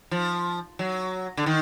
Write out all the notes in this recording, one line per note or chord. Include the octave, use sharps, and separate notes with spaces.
F3
F#3
D3
D#3